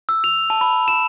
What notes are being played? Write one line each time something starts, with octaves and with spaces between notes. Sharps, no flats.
E6
F7
A5
B5
E7